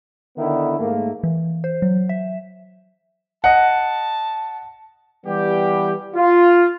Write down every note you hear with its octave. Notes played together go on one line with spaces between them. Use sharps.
D3 D#3 B3 E4
G#2 A3 A#3
E3
C5
F#3
E5
D#5 F#5 A5
E3 G3 B3 G4
F4